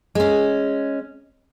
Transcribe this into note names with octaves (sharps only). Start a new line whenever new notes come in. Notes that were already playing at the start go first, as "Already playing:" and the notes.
G#3 C#4